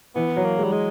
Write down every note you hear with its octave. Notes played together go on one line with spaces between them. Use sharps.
E3 B3
F#3
A#3
G#3
G3
G#3